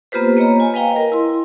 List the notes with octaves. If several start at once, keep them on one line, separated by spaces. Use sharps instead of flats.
A#3 B3 F4 G4 B4 C5
A#3 C#5 D#5 A#5
G#5
B4 D#5 F5 G5 A#5
A#4 D#5
E4 C6